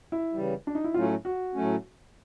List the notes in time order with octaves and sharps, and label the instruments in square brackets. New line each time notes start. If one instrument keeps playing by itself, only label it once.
[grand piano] E4
[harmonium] C#3 E3 G3
[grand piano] D4
D#4
E4
[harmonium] A2 F#3 A3 C#4 [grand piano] F4
[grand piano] F#4
[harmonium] A2 F#3 A3 C#4